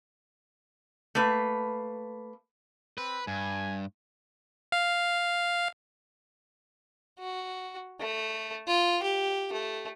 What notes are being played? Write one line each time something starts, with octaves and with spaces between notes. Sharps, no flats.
A3 A#3 B4
C4 B4
G2 G#5
F5
F#4
A3
F4
G4
A3